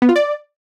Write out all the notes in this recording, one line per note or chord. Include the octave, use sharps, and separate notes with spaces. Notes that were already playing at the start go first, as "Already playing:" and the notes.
B3
F4
D5